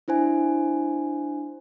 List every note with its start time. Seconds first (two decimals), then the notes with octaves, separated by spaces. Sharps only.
0.08 D4 E4 C5 G#5